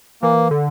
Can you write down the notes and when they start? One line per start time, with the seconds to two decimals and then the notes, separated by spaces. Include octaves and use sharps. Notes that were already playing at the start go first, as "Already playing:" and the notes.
0.22 E3 A#3
0.51 D3